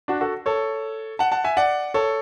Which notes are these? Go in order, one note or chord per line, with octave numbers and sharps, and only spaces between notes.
D4 F#4
F#4 A4
A4 C#5
F#5 A5
F#5 A5
E5 G#5
D5 F#5
A4 C#5